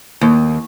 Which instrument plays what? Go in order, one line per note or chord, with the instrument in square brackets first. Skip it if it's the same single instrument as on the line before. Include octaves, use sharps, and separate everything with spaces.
[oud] D#2